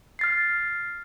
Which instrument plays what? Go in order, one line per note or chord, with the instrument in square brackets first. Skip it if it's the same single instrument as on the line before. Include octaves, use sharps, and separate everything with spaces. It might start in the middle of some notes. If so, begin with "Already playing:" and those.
[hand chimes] F6 A6 C7